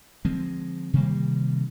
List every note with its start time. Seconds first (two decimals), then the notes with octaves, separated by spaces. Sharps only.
0.25 D3 F3 G#3 C4
0.93 C3 D#3 G3 A#3